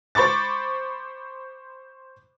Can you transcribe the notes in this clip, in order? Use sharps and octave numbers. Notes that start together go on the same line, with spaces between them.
C5 B5 C#6 D6 A6